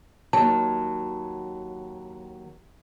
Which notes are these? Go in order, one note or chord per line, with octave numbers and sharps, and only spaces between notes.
D#2 F#3 A5